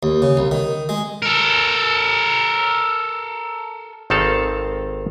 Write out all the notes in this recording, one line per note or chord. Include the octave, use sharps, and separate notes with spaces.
D#2
C#3
C2
D#3
G#3
A4 A#4
G#1 D#3 C4 A4 F5 A5